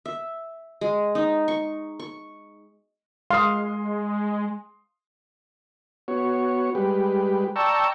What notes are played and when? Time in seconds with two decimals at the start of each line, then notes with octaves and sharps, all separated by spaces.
0.06 E5
0.81 G#3
1.15 D#4
1.48 C#6
2.00 C#6
3.31 G#3 F5 C6 D#6
6.08 B3 F#4 C#5
6.75 G3 G#3 G4 B4
7.56 D5 G5 A5 A#5 C#6 E6